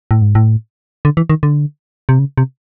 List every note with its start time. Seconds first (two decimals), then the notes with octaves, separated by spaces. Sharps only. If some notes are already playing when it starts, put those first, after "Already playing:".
0.11 A2
0.22 G#2
0.35 A2
1.05 D3
1.17 E3
1.30 D#3
1.43 D3
2.09 C3
2.19 C#3
2.38 C3